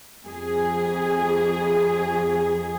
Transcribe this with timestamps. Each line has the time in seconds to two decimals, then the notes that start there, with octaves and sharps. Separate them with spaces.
0.25 F2 G#4